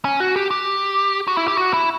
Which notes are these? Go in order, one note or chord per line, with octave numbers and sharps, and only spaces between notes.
C#4
F#4
G4
G4
F#4
E4
G4
F#4
E4